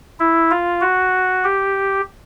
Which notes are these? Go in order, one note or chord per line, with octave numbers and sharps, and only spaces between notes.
E4
F4
F#4
G4